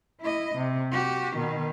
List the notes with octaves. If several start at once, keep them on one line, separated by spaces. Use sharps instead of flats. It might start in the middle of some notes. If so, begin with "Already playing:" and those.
E4 D#5
C3
F#4 G4
B2 D#3